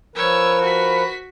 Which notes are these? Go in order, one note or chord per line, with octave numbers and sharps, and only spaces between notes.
F3 A#4 B4 C#5 E6
F#4 B6